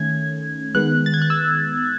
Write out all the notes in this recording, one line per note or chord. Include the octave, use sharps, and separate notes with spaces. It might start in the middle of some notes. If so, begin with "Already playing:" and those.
Already playing: D#3 A3 C#4 G#6
D#3 G#3 B3 F#6
A6
G#6
F#6
E6